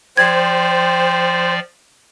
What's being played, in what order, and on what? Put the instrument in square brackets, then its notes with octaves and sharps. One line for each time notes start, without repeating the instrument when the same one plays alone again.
[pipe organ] F3 D5 [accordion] C5 [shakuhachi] G5 [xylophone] G#6